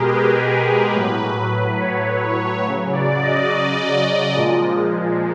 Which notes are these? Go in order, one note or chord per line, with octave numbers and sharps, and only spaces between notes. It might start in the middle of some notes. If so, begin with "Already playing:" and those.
Already playing: B2 G#3 G4 G#4 A#4
B4
A2 F#3
C#5
C#3 F#3
D5
D#5
A#2 F3 G#3